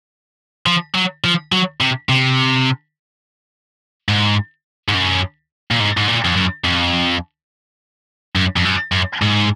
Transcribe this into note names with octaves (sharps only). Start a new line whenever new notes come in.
F3
F#3
F3
F#3
C3
C3
G#2
G#2
F#2
A#2
G#2
G#2
A#2
F2
F#2
F2
F#2
F2
F#2
F#2
G#2